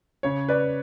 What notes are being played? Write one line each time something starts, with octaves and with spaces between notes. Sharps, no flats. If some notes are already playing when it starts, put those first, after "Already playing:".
C#3 C#5
B4 D5